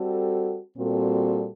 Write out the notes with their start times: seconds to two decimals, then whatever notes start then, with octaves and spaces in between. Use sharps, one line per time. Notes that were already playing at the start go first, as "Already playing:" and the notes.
Already playing: G3 C4 F#4 A4
0.77 A#2 G3 C4 F#4 A4